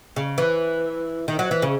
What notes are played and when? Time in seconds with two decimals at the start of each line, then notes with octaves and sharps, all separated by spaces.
0.16 C#3
0.38 E3
1.28 D#3
1.39 F#3
1.51 E3
1.62 C#3